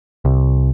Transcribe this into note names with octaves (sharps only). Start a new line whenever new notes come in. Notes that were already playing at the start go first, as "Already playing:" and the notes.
C2